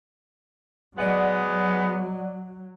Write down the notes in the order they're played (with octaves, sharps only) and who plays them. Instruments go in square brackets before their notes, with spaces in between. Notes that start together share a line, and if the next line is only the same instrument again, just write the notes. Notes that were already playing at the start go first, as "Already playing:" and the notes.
[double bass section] F#3 [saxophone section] G#3 B3 [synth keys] D5 D#5 F#5